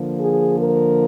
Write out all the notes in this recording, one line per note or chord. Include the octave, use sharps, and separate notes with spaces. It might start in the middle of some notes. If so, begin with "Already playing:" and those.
Already playing: D3 F3 A#3
G#4
A#4